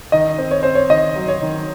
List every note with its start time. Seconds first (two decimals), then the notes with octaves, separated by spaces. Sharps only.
0.12 D#3 D#5
0.38 C4
0.51 C#5
0.63 C4 C5
0.75 C#5
0.90 D#3 D#5
1.16 F#3
1.28 C#5
1.42 D#3